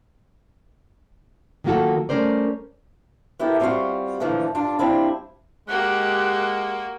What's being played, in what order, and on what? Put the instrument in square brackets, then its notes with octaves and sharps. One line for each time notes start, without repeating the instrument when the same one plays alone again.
[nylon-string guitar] D#3 F#3 A#3 F4 F#4 A4
G3 A3 C#4 A#4 C5 D5
[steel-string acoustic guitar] B3 E4 G4 A4 A#4
G3 C4 D4 F4 F#4 F5
A#2 D3 E3 F3 A3
G2 D4 F4 A5
G3 C4 D4 E4 F4
[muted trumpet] G#3 [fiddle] A#3 F#4 [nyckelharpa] G4 [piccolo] F#6